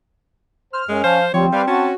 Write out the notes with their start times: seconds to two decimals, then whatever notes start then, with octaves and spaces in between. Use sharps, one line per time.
0.73 C5 F6
0.89 F#2 G#3 C#4
1.04 F3 C5 F5
1.34 D2 F3 G3 C4 C#5
1.53 G3 G4 B4 D5 F5
1.67 C#4 F#4 A5